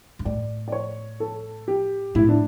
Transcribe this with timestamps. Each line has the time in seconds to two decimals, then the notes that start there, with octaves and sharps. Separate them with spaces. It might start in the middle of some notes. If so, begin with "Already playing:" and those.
0.19 G2
0.25 A2 D5
0.68 D5
0.72 C#5
1.20 A4
1.68 G4
2.15 A2 E4
2.29 D4